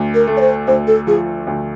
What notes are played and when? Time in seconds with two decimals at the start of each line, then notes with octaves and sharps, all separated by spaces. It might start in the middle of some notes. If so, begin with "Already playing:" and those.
Already playing: D2
0.14 A#4
0.27 A3
0.37 C#5
0.41 C5
0.67 D2 C5
0.87 A4
1.07 F3 G#4
1.47 D2